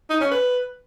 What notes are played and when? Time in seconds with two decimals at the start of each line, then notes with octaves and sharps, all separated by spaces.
0.10 D#4
0.21 C#4
0.31 B4